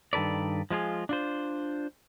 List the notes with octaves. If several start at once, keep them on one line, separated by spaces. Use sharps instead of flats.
G2 D#3 A4 B4 D5
F3 G#3 F4 G#4
D4 F4 C5